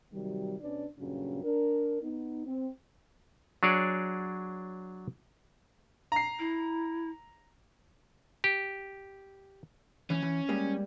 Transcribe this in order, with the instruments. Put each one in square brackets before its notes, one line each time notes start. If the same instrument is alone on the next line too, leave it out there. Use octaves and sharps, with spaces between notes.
[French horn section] C3 D#3 F#3 G3
B2 C#4 D4 B4 D5
G2 A#2 C#3 F#3 C#4
D4 A#4
B3 D#4
C4
[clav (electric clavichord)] F#3 D4 G#4 C#5 D5
[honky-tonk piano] A#5 C7
[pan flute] E4
[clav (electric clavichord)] G4
[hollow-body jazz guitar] E3 [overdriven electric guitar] C#4
[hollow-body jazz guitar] E3
G3 G#3 A#3